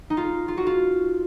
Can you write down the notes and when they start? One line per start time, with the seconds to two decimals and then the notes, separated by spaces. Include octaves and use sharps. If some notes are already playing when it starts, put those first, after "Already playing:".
0.10 D#4
0.17 F4
0.48 F4
0.57 F#4
0.67 F4